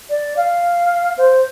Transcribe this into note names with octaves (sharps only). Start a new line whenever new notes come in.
D5
F5
C5